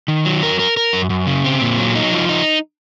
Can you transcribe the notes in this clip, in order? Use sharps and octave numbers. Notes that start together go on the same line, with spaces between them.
D#3
F#3
A#4
A#4
A#4
F#2
F#2
C#3
C4
A#2
F#3
D#4
F3
D#4